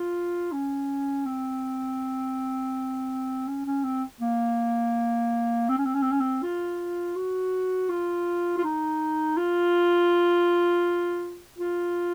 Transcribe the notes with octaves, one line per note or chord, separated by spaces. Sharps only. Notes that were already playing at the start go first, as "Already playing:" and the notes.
Already playing: F4
C#4
C4
C#4
C#4
C4
A#3
C4
C#4
C4
C#4
C4
C#4
C4
F4
F#4
F4
F4
D#4
F4
F4